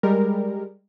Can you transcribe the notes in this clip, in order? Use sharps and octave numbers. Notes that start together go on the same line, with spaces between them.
G3 G#3 A#4